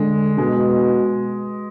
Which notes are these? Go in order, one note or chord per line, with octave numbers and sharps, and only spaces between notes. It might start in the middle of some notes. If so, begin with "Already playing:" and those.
Already playing: D3 G#3
B2 G#3